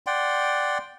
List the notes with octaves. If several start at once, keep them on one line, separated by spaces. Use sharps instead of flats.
D5 F#5 G5 C6